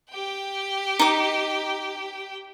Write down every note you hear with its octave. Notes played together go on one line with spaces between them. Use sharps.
G4 G5
D#4 D6